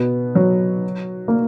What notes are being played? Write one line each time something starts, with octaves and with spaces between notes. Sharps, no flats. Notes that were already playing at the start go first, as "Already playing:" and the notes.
Already playing: B2 B3
F#3
A#3